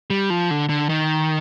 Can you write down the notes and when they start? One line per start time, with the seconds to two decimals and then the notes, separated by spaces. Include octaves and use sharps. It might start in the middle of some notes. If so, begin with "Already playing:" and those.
0.10 G3
0.30 F3
0.51 D3
0.69 D3
0.89 D#3